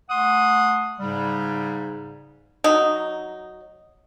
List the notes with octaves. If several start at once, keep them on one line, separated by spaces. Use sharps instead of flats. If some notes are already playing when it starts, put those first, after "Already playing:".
A3 F#5 C6 D#6
G#2 C#3 G3
F#3 D#4